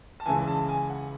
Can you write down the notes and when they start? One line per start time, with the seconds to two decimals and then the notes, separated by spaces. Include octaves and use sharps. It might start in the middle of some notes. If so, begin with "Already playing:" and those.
0.20 A5
0.26 C#2 C#3 E3 G#5
0.47 A5
0.69 G#5
0.90 F#5